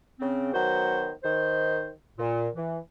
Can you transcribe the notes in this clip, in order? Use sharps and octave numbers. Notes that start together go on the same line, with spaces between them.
C#3 C4
D#3 F#3 B3 F#4 C5
D#3 C5
A#2
E3